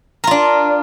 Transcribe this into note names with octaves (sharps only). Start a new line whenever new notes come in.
D4 F4 A#4